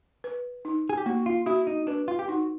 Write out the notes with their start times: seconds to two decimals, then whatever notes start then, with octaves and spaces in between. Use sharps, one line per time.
0.24 B4
0.65 D#4
0.89 G#4
0.98 G4
1.06 A#3 F#4
1.26 F4
1.46 E4 F#4
1.67 D#4
1.87 D4 B4
2.08 F4
2.19 G4
2.28 D#4 F#4